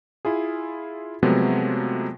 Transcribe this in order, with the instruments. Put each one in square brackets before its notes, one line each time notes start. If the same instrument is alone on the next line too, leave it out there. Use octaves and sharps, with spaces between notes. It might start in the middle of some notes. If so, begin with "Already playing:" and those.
[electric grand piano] E4 F4 G#4
C3 F3 F#3 G#3 A3 B3